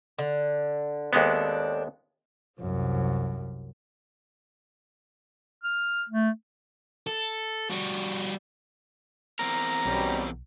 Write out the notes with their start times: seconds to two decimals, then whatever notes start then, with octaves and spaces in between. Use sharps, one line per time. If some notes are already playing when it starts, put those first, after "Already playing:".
0.19 D3
1.13 D#2 G#3 B3 C4 D4 A4
2.61 C2 F#2
5.64 F6
6.09 A3
7.07 A4
7.70 G3 F#4
9.39 E2 C4 A#4 A#5
9.86 B1 B2 G3 C#4